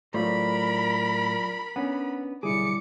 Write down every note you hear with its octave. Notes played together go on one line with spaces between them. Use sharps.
A2 F#3 A3 F4 A#4 C5 D5 B5
B3 C#4 D4 F#5
B1 D3 G3 E4 G#4 D6 C#7